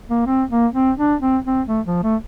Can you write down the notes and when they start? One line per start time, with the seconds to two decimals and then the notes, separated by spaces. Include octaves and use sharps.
0.09 A#3
0.27 C4
0.50 A#3
0.74 C4
0.98 D4
1.21 C4
1.45 C4
1.68 A3
1.86 F3
2.03 A3